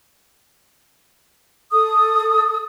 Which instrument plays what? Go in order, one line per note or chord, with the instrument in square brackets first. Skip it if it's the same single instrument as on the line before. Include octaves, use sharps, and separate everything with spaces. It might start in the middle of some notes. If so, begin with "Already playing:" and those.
[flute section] A4 D#6